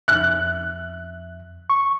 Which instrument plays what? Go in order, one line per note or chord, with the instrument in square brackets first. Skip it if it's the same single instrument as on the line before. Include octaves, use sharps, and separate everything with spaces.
[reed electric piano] F2 E5 [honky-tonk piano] F#6
[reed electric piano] C#6